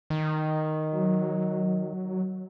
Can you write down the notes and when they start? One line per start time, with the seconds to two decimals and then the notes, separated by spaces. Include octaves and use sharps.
0.10 D#3
0.92 F#3